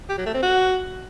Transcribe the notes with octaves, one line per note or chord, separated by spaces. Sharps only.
G4
F#3
A3
C4
F#4